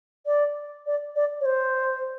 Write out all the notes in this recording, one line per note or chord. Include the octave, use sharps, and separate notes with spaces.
D5
D5
D5
C#5
C5